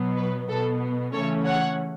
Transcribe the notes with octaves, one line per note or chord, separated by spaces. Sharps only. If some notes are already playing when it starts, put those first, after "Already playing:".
Already playing: B2 F#3 B3
B4
B2 B3 A4
C#3 E3 A3 C#4 A4 C#5
C#5 F#5